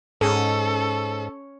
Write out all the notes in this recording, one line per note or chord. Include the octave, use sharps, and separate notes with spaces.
G#2 C#4 G#4 A4